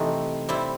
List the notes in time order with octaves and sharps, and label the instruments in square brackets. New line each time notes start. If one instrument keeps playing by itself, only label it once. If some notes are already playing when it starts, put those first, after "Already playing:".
Already playing: [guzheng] C3 E3 A3 C4 D#4
G3 C4 E4